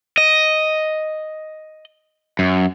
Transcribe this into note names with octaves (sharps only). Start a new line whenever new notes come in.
D#5
F#2